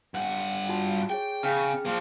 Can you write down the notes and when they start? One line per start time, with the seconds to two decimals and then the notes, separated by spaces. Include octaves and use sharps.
0.14 G2 F#5
0.68 F4 F#4 A5
1.10 G#4 C#5 G5
1.43 C#3 G#4 G5 F6
1.85 F3 A#3